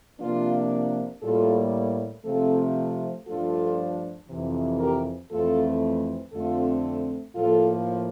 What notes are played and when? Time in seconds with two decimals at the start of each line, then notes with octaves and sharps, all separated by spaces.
0.20 C3 F3 A#3 D4 F4
1.22 A2 G3 A#3 F4 A4
2.25 C3 F3 A3 C4 F4 A4
3.27 G2 F3 A3 D4 F4 A4
4.29 F2 C3 E3
4.80 G4 A#4
5.31 F2 E3 A3 C4 F4 A4
6.33 F2 D3 A3 C4 F4 A4
7.35 A2 F3 A#3 F4 A4